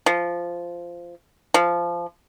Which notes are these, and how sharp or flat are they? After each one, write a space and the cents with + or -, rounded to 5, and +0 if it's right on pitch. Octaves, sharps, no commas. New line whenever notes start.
F3 -10
F3 -15